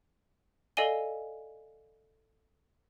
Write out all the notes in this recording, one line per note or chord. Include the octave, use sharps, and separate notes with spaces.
A4 D5 D#5 F5 G#5 G7